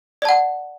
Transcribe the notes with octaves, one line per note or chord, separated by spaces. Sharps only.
D5 F#5 A5